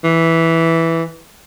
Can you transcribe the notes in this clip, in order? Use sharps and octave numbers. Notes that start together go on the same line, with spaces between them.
E3